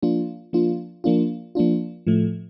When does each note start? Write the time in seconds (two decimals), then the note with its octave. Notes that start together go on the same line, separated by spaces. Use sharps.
0.02 F3 A#3 D4 F4
0.53 F3 A#3 D4 F4
1.04 F3 A#3 D4 F4
1.55 F3 A#3 D4 F4
2.07 A2 F3 A3